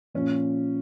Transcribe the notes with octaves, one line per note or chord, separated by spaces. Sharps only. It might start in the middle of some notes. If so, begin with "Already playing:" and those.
A#2 F3 C#4